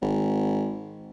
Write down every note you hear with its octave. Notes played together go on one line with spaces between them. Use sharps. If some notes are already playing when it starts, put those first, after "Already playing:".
G#1